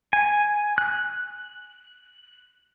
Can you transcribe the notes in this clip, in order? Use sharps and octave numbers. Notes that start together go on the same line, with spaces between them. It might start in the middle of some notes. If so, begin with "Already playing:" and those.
G#5
F#6